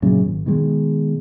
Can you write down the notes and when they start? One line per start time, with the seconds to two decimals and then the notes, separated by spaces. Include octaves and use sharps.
0.02 F#2 A#2 C#3
0.22 G#1
0.46 B2 D#3 G3 G#3